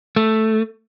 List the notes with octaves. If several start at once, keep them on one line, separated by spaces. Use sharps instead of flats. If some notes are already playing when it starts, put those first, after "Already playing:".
A3